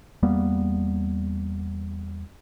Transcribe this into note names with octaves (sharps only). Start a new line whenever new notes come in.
E2 G3 A#3 B3